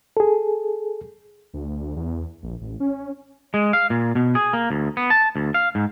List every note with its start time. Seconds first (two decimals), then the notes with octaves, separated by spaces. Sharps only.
0.17 G#4 A4
1.54 D2
1.96 E2
2.43 A#1
2.61 A1
2.80 C#4
3.54 G#3
3.73 F5
3.90 A#2
4.15 B2
4.35 G#4
4.53 A#3
4.70 D2
4.97 B3
5.10 A5
5.36 D2
5.54 F5
5.75 G#2